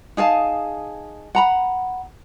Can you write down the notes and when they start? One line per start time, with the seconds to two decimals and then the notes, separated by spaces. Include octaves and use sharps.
0.17 D#4 G#4 F5 A5
1.35 F#5 A#5 B5